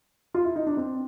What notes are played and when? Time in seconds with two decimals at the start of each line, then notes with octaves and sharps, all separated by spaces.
0.34 F4
0.45 E4
0.56 D#4
0.67 D4
0.77 C4